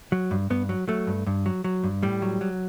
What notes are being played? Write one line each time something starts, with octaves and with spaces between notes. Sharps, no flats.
F#3
G2
G2 B3
F#3
F#3 A3
G2
G2
F#3
F#3
G2
A2 G3
F#3
F#3